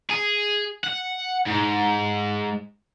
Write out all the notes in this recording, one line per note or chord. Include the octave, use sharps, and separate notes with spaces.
G#4
F#5
G#2